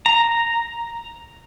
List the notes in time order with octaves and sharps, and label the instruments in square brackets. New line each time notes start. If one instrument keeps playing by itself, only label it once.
[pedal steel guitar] A#5